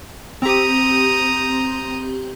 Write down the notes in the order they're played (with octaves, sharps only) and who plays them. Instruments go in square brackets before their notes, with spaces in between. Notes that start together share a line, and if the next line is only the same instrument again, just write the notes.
[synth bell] C4 G4 [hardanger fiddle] A#5 D#6